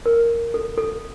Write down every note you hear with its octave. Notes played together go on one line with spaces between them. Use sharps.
A#4
A4
A4